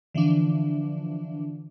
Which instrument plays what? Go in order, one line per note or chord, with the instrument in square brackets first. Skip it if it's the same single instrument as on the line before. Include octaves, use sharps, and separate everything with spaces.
[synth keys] D3 E3 F3 D4